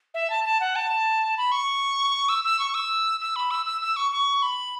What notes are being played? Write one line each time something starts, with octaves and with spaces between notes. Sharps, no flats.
E5
A5
A5
F#5
A5
B5
C#6
E6
E6
C#6
E6
E6
B5
E6
E6
E6
C#6
C#6
B5